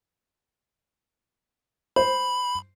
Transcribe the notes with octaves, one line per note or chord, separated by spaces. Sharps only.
C5 B5